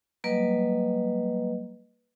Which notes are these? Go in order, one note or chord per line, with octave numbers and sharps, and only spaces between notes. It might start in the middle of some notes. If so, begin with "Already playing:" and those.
F#3 G3 A#3 B4 D#5